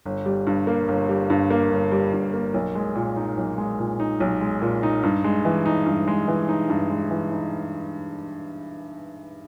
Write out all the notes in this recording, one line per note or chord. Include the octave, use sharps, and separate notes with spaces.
G1
G3
G2
A#3
G1
G3
G2
A#3
G1
G3
G2
A#3
B1
G#3
A#2
D#4
B1
G#3
A#2
D#4
B1
G#3
A#2
D#4
G2
G#3
E3
D#4
G2
G#3
E3
D#4
G2
G#3
E3
D#4